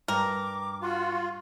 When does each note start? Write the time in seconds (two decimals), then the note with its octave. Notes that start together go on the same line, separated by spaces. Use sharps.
0.08 G2 A#4 D6
0.81 F4 F#4